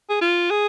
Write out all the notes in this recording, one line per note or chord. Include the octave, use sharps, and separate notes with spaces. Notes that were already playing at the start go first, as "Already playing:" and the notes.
G#4
F4
G#4